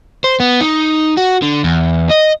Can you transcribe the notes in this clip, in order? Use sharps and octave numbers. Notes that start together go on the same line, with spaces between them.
C5
B3
D#4
F#4
D3
E2
D#5